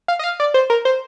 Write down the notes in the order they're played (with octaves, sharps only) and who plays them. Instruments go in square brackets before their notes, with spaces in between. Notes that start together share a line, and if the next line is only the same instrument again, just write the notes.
[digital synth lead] F5
D#5
F5
D5
C5
A#4
C5